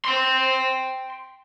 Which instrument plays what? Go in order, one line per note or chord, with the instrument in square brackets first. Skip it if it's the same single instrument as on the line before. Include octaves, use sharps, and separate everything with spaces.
[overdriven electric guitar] G5 C6